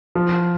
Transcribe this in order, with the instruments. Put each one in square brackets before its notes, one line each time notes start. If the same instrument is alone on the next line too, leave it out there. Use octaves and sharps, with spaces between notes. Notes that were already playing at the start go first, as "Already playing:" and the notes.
[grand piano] F3